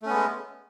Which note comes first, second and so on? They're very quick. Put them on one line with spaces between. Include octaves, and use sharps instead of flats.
A3 C#4 B3 G#3